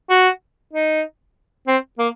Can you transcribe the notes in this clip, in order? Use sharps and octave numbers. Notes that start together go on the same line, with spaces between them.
F#4
D#4
C4
A#3